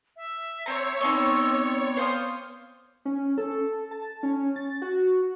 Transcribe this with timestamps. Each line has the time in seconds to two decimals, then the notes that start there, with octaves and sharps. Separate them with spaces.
0.16 E5
0.66 C4 C#5 A#5 C#7
1.01 B3 C4 D#4 D5 C6 C#6 E6
1.97 C5 F5 C6 D#6
3.05 C#4
3.38 A4
3.91 A5
4.23 C#4
4.56 A6
4.82 F#4